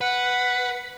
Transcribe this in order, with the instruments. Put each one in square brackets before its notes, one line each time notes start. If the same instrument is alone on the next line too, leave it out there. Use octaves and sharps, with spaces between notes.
[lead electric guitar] B4 [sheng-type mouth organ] F#5